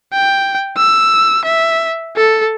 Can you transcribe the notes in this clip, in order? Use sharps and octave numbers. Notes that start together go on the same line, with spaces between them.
G5
E6
E5
A4